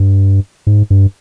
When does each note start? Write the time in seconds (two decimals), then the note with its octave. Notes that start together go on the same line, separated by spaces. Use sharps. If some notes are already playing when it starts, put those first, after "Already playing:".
Already playing: G2
0.67 G#2
0.90 G2